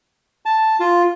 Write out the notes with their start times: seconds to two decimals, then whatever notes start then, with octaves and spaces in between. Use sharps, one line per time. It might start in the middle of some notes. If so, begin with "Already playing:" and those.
0.45 A5
0.80 F4